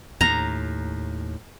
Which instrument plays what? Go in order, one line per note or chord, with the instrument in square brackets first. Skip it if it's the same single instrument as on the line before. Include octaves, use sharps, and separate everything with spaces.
[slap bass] D#2 A2 [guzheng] A#5